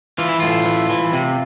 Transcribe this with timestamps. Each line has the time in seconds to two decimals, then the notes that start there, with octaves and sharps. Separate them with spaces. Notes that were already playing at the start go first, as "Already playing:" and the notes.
0.18 E3 F4
0.29 E4
0.40 A2 F4
0.66 E3
0.90 E3
1.13 C3